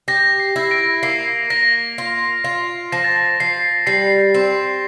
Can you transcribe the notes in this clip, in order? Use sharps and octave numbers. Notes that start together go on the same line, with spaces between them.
G4 A#6
C7
E4
A#6 D7
A#3 C7
A#3 A#6
F4
F4
F3 A#6
A6
A#6
F3 C7
G3 C7
C4